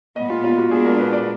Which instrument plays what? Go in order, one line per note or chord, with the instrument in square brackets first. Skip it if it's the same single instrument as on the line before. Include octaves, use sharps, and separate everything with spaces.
[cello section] A#2 [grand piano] D#5
[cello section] G#3 B3
[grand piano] F4
F4
F#4
[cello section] A#2 G#3 B3 D4 [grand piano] G#4
[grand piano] A#4
B4
D5